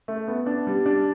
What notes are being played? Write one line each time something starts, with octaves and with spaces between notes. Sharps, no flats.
A3
B3
D4
G3
D4